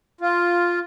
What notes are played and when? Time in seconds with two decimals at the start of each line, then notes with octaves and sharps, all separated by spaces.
0.21 F4